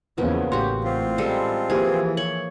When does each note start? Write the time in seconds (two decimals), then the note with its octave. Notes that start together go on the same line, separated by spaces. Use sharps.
0.18 E2 C#3 F3 A#3 B3
0.52 A1 F#4 G4 C6
0.84 C4 F4
1.18 G3 G#3 A4
1.70 E3 F3 A#3 G4 G#4 C5
2.17 C#5 F#7